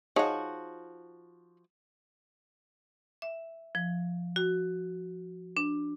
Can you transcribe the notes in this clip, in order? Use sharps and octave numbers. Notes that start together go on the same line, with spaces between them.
F3 D#4 F#4 G#4 C#5
E5
F3
F#4
D4